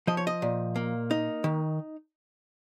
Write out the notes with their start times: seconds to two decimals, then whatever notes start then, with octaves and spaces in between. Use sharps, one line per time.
0.07 F3 D#5
0.17 C#5
0.27 D#5
0.42 A#2
0.76 A#3
1.11 D#4
1.44 D#3